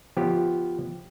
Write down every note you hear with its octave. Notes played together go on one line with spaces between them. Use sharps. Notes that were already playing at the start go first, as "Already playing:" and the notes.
F3 B3 G4